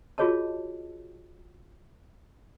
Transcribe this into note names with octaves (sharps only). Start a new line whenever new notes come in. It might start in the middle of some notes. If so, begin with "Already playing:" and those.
F4 F#4 G#4 C#5 D#5 A5